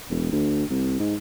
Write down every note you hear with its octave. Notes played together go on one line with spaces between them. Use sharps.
E1
D2
C2
G#2